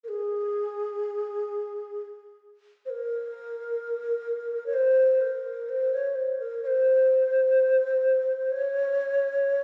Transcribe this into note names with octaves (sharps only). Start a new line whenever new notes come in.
A#4
G#4
C5
A#4
C#5
C5
A#4
C5
C#5
C5
A#4
C#5
C5
C#5